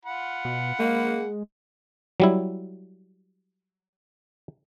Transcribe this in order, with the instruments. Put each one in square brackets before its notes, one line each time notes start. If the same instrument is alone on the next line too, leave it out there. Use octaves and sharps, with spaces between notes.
[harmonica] F4 F#5 B5
[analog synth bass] B2
[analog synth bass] G#3 [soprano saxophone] A#3
[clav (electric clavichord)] F#3 G3 E4